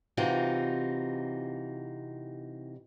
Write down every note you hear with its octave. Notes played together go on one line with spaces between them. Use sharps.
C3 E3 D#4 F4 F#4